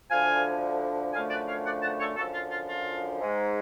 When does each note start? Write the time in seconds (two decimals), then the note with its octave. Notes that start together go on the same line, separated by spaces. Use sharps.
0.10 D2 D3 F3 F5 G#5
1.14 F#2 D3 F3 A3 F5 G#5
1.31 B4 D5
1.48 C#5 F5
1.66 D5 F#5
1.82 F#5 A5
2.00 A4 C#5
2.17 F#2 D3 F3 F#4 A4
2.34 F4
2.51 F4
2.69 F4
3.20 G#2 G#3